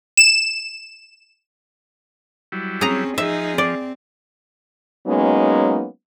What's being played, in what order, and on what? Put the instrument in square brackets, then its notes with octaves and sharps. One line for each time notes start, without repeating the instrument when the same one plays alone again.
[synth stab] E7
[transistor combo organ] F#3 G3 E4
[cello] C4 C#4 [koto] G#4 A#5
[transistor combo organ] F3 [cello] D#4 G#4 [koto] E5
[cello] C4 [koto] D5
[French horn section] F#3 G#3 A#3 B3 C#4 D#4